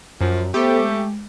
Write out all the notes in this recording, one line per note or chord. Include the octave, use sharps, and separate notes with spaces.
F#2 F3
A3 B3 G4 A4 C5
G#3